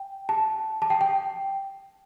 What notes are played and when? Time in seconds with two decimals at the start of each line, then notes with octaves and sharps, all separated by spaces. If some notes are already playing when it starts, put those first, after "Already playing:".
Already playing: G5
0.29 A5
0.82 A5
0.90 G5
1.01 G5